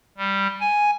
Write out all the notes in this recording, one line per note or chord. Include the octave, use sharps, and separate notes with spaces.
G3
G#5